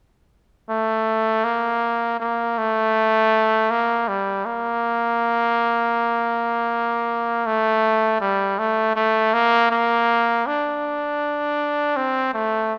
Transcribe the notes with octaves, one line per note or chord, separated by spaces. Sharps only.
A3
A#3
A#3
A3
A#3
G3
A#3
A3
G3
A3
A3
A#3
A#3
D4
C4
A3